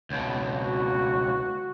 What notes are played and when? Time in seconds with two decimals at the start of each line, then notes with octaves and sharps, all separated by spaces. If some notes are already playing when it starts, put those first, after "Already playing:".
0.10 C#2 B2
0.64 F#4